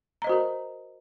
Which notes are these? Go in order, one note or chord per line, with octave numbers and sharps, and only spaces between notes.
F#4 A#4 C5 D#5 A#5